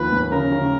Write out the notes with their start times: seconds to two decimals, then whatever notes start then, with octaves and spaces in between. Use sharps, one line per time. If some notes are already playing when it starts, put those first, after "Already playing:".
Already playing: D#2 F3 B4
0.12 D#2
0.32 C#3 A#4
0.52 C#3